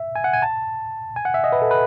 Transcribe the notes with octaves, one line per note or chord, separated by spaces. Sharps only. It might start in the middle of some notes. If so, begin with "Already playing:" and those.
Already playing: E5
G#5
F#5
G#5
A5
G#5
F#5
E5
D#5
B4
A4
B4